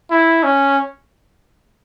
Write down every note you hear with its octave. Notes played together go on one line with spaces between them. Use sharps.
E4
C#4